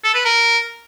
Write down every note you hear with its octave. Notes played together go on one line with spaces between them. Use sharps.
A4
B4
A#4